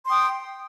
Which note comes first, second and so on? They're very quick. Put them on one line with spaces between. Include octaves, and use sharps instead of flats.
C6 D#6 G5